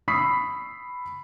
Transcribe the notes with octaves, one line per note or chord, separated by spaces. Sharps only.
B5 C#6 D#6 E6 B6 C7